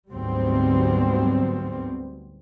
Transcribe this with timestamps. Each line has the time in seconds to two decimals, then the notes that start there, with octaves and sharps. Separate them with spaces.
0.12 D2 G#2 F#3 G3 B3 C4